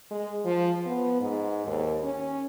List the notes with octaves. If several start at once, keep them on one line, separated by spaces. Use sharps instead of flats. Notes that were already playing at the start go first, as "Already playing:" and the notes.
G#3
F3
B3
G#2
D#2
C#4